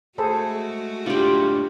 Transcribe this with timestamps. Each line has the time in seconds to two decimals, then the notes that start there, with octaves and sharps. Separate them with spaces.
0.18 G#3 A3 F#4 G#4 A4 C5
1.06 A2 D4 F4 G4 B4